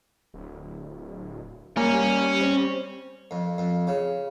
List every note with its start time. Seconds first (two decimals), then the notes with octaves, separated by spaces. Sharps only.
0.34 D1
1.77 G3 A#3 C#4
2.41 C4
3.31 F2
3.58 F2
3.87 C#3